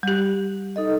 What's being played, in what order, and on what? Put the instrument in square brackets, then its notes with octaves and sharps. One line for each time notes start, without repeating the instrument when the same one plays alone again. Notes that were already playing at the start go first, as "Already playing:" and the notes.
[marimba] G3 G4
[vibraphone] D#4 A4 D#5